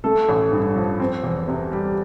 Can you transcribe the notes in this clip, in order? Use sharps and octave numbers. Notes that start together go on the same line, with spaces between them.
A3 A4
A1
G2
F3
C4
E2
C3
G3